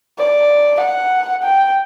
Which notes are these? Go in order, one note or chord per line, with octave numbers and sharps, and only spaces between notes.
D5
F#5
G5